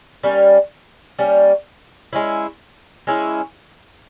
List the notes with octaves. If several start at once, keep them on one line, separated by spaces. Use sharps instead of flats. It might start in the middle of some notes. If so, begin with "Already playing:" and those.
G3 A#3 C#4
G3 A#3 C#4
G#3 C#4 E4
G#3 C#4 E4